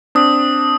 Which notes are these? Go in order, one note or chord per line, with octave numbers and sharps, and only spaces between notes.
C4 D4 D#6